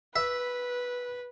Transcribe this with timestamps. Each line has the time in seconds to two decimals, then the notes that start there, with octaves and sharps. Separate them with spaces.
0.16 B4 E5